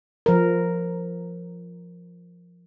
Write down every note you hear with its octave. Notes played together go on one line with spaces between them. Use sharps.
F3 A#4